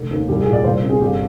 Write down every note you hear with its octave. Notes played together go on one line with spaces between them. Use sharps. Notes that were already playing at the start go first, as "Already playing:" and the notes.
Already playing: F1 D3
D#2
C2 G4
G#4
A#2
D5
C2 C5
C3
G#4
G1 G4